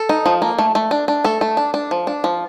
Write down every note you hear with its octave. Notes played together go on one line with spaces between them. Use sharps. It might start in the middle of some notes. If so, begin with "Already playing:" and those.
Already playing: A4
D#4
F3
A#3
A3
A3
D4
D4
A3 A4
A3
D4
D4
F3
D4
F3